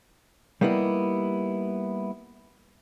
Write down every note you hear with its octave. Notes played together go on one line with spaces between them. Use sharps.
G3 A#3 B3 D#4 E4